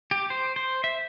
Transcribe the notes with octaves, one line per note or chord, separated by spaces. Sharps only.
G4
C5
C5
E5